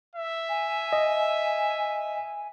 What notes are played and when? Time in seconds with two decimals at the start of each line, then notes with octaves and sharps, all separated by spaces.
0.15 E5
0.49 G#5
0.93 D#5